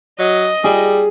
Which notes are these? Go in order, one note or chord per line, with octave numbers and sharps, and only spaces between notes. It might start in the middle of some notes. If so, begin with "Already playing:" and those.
F#3 D#5
G3 G#4